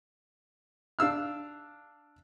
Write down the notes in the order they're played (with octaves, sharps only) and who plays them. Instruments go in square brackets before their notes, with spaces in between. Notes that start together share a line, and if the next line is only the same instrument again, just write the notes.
[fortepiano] D4 F5 E6 F6